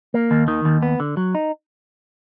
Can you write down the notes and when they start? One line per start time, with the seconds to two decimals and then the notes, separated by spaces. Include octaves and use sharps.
0.14 A#3
0.31 D#2
0.48 D#3
0.65 D#2
0.83 B3
1.00 D3
1.17 F#3
1.35 D#4